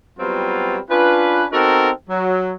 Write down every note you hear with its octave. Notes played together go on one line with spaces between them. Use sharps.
F#3 G3 B3 C4 F4
C#4 D4 F4 B4
B3 C4 D#4 F#4 A4 A#4
F#3